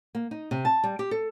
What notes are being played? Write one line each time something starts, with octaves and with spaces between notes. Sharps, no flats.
A#3
D#4
C3
A5
G3
G4
A4